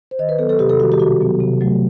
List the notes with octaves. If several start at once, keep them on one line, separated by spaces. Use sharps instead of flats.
C5
D#3 D#5
B4
F#3 B3 A4
A4
C3 G4
A4
D#3 G3 F#4
G4
B2 F#4
F#3 B3
C3
F#3 A3